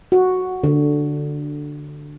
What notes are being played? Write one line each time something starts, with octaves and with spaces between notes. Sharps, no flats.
F#4
D3